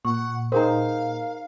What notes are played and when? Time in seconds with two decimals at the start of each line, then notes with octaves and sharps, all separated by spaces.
0.05 A#2 F#5 C#6
0.52 D#4 G#4 A#4 C5 F5 A#5